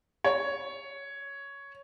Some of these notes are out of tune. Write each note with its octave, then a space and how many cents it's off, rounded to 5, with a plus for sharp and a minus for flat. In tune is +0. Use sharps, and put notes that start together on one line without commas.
C#5 +5